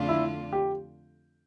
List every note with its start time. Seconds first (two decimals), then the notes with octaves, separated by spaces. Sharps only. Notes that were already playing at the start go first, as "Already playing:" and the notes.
Already playing: F2 D3 A3 D4 F4
0.09 E4
0.53 G4